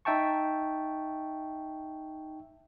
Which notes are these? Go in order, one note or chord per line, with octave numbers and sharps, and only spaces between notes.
D#4 E5 G5 A5 C#6